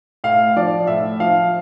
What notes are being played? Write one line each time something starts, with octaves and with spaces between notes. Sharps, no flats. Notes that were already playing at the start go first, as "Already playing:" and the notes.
A2 F5
F3 D5
A2 E5
F3 F5